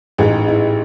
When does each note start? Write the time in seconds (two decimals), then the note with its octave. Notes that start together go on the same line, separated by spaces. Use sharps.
0.18 A1 G#2 G#3 G#4
0.48 E4